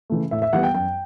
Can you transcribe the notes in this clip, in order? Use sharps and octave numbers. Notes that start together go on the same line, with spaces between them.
C#3 E3 A3
A2 E5
E5
E3 G3 B3 F#5
G5
F#2 G5